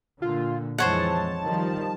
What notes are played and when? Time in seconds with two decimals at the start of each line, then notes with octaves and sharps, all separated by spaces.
0.22 A#2 D3 F4
0.78 F2 E3 G#3 C5 C#5 F#5 A5
1.43 D#3 F3 G3